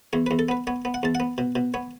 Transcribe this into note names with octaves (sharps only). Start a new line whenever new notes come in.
E2 C#5
E2 B4
A4
B3 B4
B3 C#5
B3
F#5
E2 A5
F#5
B3
B2
B2
B3 C#5